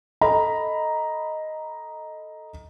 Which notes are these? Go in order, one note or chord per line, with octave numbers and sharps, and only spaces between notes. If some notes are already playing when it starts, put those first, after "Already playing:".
A4 D#5 A#5 B5